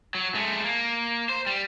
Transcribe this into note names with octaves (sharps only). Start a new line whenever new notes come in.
F#3
G#3 A3
A#3
C5
G3